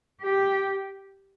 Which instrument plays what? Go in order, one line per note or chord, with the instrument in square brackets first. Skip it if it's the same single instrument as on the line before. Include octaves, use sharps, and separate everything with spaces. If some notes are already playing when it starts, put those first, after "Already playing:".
[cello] G4